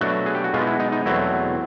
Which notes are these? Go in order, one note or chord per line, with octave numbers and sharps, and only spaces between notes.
B2 F#3 A3 D4 F#4
G#4
G4
F#4
B2 G#3 B3 F4
D#4
E4
D#4
D#4
E2 B2 F#3 A3 C4 E4